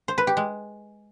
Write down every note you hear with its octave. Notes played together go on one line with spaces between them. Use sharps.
C5
B4
G4
G#3